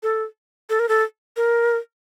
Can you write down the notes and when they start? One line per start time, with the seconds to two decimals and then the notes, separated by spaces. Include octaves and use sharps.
0.03 A4
0.70 A4
0.79 A#4
0.89 A4
1.37 A#4